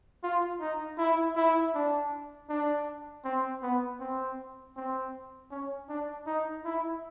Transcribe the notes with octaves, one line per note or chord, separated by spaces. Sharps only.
F4
D#4
E4
E4
D4
D4
C4
B3
C4
C4
C#4
D4
D#4
E4